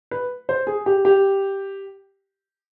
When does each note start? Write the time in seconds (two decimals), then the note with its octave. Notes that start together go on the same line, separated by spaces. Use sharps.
0.11 B4
0.49 C5
0.67 G#4
0.86 G4
1.05 G4